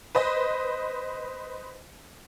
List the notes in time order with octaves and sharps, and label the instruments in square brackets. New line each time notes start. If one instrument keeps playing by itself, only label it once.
[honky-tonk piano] B4 C5 D#5